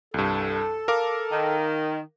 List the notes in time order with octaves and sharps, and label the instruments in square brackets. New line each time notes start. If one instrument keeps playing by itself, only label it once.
[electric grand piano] C2 G2 [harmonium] A4
[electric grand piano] A#4 F5 D6
[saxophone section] D#3